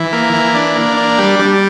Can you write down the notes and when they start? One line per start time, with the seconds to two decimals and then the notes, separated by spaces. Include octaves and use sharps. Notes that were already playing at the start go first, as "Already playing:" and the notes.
Already playing: E3
0.13 A#3
0.33 E3
0.55 D4
0.75 A#3
0.97 D4
1.18 G3
1.39 G3